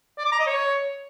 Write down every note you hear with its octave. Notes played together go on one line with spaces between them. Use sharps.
D5
D6
A#5
D#5
C#5